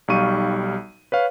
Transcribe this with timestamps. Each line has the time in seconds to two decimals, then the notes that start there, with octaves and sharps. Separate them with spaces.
0.08 B1 G3 D#4 F5 C#6 D#7
1.12 B4 C#5 F5